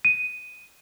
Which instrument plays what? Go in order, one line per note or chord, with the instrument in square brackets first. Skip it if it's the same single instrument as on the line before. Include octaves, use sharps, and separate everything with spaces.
[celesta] D#7